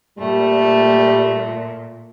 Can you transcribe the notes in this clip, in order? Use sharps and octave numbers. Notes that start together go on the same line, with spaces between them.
A#2 G3 A3